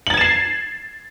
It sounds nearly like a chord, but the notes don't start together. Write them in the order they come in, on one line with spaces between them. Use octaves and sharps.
F#7 A6 G#6 E7 C7